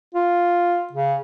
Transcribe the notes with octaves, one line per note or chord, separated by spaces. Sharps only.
F4
C#3